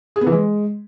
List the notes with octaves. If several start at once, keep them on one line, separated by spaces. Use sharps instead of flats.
G#4
B3
E3
G#3